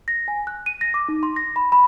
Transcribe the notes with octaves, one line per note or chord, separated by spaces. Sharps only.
A#6
G#5
F#6
D#7
A#6
D6
D#4
C6
A#6
B5
B5